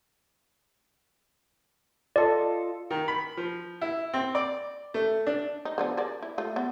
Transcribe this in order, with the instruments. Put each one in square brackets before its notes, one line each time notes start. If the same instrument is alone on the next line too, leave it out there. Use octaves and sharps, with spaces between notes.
[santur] F4 A4 D#5 [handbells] D5
[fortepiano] D#3
B5
F3
E4
C4
D5
A3
D4
[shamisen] D#4
D3 F3 B3
G#4 A#4 D5
E4
A3 F4
B3